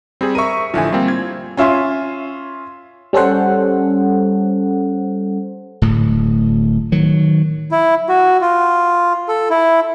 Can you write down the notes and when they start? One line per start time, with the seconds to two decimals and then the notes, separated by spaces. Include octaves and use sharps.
0.21 G3 C4 G#4
0.35 A#4 E5 C#6 D#7
0.74 A1 D3 F3 E4 G#5
0.92 G3 A#3 C4 F4
1.08 G#6
1.57 C#4 F4 E5 G#5 C6
3.13 G3 C#4 A4 C5 F#5
5.82 D1 A2
6.92 D#3 F#3
7.71 E4
8.09 F#4
8.41 F4
9.28 A4
9.50 E4